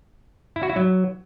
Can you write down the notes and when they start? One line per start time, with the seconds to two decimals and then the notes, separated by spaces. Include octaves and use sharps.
0.56 E4
0.63 F#4
0.69 E4
0.76 F#3